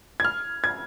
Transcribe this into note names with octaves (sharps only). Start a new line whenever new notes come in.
G#6
F6
G#6